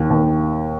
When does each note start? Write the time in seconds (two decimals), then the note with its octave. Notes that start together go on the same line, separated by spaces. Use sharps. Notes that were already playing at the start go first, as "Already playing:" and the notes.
Already playing: D#2
0.10 D#2